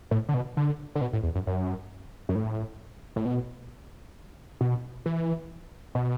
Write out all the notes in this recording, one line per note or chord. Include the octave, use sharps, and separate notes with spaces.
A2
D3
B2
D3
D3
B2
A2
E2
F#2
F#2
F#2
A2
A2
B2
B2
E3
B2